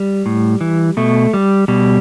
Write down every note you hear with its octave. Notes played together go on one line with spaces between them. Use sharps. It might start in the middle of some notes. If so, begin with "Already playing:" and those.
Already playing: G3
A2
E3
B2 A3
G3
B2 G3